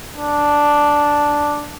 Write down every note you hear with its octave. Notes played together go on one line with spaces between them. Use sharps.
D4